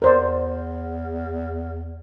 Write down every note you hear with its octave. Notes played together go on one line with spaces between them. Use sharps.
E2 A#4 C5 D5